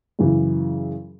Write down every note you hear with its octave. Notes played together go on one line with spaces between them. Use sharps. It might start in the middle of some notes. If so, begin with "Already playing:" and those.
F#2 C#3 E3